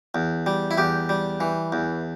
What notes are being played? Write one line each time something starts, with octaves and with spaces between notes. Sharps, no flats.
E2
G3
E4
E2 G4
G3
E3
E2